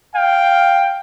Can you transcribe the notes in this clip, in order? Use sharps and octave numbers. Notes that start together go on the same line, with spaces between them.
F5 G5